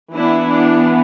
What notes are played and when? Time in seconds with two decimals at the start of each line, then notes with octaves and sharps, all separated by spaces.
0.13 E3 B3 D4 E4
0.50 D4